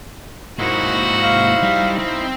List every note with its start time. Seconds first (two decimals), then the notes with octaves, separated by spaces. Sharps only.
0.59 G#2 A#3 D#4 E4 F#4 C5
1.23 F5
1.63 G3
1.99 C4